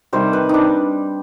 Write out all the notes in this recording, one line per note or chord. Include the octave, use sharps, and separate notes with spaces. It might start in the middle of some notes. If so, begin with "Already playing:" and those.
C3 D#3 G3 C5
B4
D4 D#4